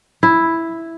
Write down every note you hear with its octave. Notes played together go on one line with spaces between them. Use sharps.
E4